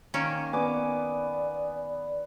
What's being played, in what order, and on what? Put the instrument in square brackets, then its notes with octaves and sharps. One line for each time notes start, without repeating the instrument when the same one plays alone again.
[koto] D#3 A#3 C#4
[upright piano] B3 [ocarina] D5 [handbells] G#5 D6